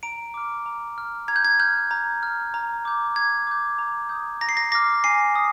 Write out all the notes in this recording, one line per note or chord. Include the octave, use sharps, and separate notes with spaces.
A#5 D7
D6 F6
A#5
F6
A#5 G#6
G6
G#6
F6 G6
A#5
F6
A#5
D6 G6
A#5 G#6
D6 G6
A#5
D#6 G6
A#5 A#6
C7
A#6
D6 F6 A#6
G#5 C7
D#6